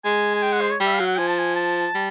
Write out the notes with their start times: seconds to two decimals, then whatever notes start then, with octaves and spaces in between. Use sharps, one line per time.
0.05 G#3 G#5
0.35 G#5
0.43 G5
0.52 F#5
0.61 C5
0.71 C#5
0.80 G3
0.86 E5
0.93 F5
1.00 F#3
1.06 F#5
1.18 F3 G#5
1.28 A5
1.38 G#5
1.56 A5
1.95 G3